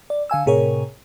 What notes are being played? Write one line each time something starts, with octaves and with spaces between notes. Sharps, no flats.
D5
D3 F5 G#5 E6
A2 C3 G#4 A#4 C#5